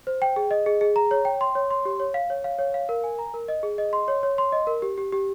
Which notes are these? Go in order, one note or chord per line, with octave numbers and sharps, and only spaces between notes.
C5
G5
G#4
D#5
G#4
G#4
A#5
C#5
G5
C6
C#5
C6
G4
C#5
F5
C#5
F5
C#5
F5
A#4
G#5
A#5
A#4
D#5
G#4
D#5
C6
C#5
C#5
C6
D#5
A#4
G4
G4
G4